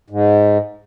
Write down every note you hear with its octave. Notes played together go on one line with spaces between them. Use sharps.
G#2